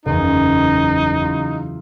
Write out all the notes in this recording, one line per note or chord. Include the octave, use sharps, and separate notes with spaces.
F#1 E2 D#4
E4 F4